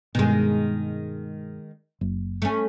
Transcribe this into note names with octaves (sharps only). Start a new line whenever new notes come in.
G2 B2 D#3 G#3
F#1
A3 C#4